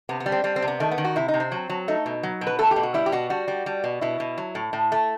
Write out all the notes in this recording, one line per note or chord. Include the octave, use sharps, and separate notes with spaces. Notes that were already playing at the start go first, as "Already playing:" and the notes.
C3 B3
B3
G3
C4
G3 C4
C4
C3
B3
D#3 A3
B3
D#3
F#4
C3 E4
D#4
C3
C4
F#3
F#3
A3 D#4
B2
F#3
B2
B4
A3 A4
G4
B2
F#4
G3 E4
G4
B2 F#4
G3 F#4
G3
G3
B2
B2 E4
B2
F#3
A2
A2
A3